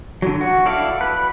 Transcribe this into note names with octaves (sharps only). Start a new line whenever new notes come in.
D3 F#3
F#4
E4 A4 D5 F5
B4